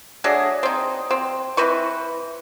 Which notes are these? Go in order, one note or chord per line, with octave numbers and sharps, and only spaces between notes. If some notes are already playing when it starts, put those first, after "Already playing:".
F#3 A3 D4 G#4
C4 D#4
C4
E3 C4 B4 C#6